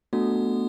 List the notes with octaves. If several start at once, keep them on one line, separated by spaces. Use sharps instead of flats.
A3 B3 D4 F#4 A4